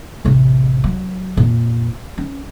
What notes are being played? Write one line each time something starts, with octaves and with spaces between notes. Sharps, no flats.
A1 C3
F#3
F2 A#2
C#4